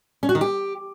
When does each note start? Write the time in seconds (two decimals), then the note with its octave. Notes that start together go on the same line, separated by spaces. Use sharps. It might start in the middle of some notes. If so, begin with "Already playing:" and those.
0.23 C#4
0.29 F#4
0.35 D#3
0.41 G4